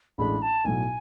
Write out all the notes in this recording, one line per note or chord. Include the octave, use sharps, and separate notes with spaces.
A1 A2 G#3 D4 B5
A5
B1 A2 F#3 G#5